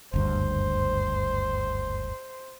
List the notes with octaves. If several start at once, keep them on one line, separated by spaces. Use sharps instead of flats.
F#1 D2 G2 C5